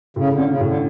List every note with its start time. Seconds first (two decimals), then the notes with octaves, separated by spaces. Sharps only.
0.16 A2 C#3
0.33 D3 C#4
0.49 C#3
0.60 A2
0.66 D3